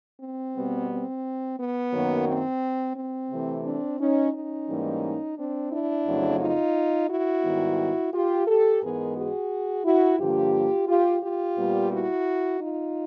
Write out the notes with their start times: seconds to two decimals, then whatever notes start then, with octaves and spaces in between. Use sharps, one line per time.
0.21 C4
0.55 B2 G3 B3
0.91 C4
1.59 B3
1.93 F#2 D#3 F#3 A#3
2.28 C4
2.97 C4
3.31 C3 E3 A3
3.65 C4 D4
4.01 C#4 D#4
4.34 C#4 D#4
4.68 G#2 E3 G3 A#3
5.37 C4 D4
5.72 D4 E4
6.07 F2 C#3 F#3 A3
6.41 D#4 F4
7.10 E4 F#4
7.44 G#2 D#3 G3 B3
8.14 F4 G4
8.48 G4 A4
8.82 G#2 E3 G#3 B3 G#4 A#4
9.17 F#4 G#4
9.85 E4 F#4
10.19 G2 D3 F3 A#3 F4 G4
10.88 F4 G4
11.23 F4 G4
11.57 A#2 G3 B3
11.92 E4 F#4
12.60 D#4 F4